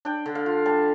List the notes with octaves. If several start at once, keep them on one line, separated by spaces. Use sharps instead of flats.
D4 G5
D3
F5
F4
G3 A5